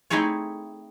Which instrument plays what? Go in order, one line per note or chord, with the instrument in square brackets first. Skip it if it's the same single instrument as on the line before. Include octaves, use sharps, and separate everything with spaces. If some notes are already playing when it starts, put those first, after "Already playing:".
[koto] A3 C4 D#4 E4 G#4 C#5